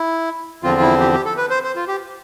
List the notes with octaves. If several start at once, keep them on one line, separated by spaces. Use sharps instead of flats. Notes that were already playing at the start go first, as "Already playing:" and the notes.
Already playing: E4
E2 D3 F3 C4 F4
F4
E4
G4
G4
A4
B4
C5
C5
F4
G4